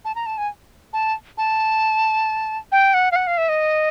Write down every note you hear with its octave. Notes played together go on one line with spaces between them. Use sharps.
A5
A#5
A5
G#5
A5
A5
G5
F#5
F5
F#5
F5
E5
D#5